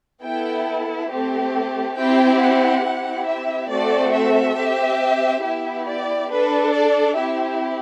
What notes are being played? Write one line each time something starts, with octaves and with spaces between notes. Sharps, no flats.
B3 E4 A4 G5
A3 C4 G4
C4 E4 G4 G5
F#5
C4 E4 G4
E5
A3 C4 F#4 A4 D5
E5
C4 G4
B3 E4 G4 E5
D5
D4 A4 B4
D5
C4 E4 G4 E5